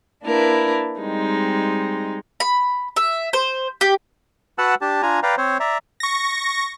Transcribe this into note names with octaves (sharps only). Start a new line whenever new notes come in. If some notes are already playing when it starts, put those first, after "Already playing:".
A#3 D4 E4 A#4 B4
G3 G#3 C4 D#4
B5
E5
C5
G4
F#4 B4 F#5 A5 E6 F#6
D4 G4 A5
D4 F4 G#5 A#5
B4 D5 F5 G5 A#5
C4 C5 C#5
D5 E5 A#5
C#6 A#6